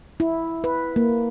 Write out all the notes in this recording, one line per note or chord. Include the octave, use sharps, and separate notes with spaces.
E4
B4
A#3